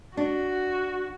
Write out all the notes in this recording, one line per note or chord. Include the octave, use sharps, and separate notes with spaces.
D4 F#4